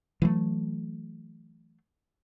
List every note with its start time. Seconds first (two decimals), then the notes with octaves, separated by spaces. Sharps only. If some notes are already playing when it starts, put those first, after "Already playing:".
0.22 E3 F#3 A3